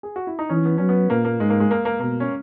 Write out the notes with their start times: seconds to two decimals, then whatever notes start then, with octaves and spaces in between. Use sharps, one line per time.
0.03 G#4
0.16 F#4
0.27 E4
0.39 D#4
0.49 E3 C#4
0.65 B3
0.78 F#3 C#4
0.89 B3
1.10 A#2 A#3
1.25 A#3
1.40 G#2 G#3
1.50 A#3
1.60 G#3
1.71 A#3
1.85 A#3
2.00 B2 A#3
2.20 C#4